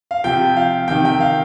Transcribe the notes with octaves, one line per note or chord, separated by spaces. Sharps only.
F5
C3 F3 G5
F5
C3 D#3 G5
G5
F5